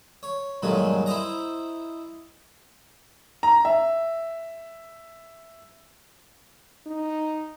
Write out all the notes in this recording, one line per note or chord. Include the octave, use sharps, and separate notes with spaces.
C#5
G2 A#2 D3 D#3 F#3 G#3
E4 C5 D#5 A#5
A#5
E5
D#4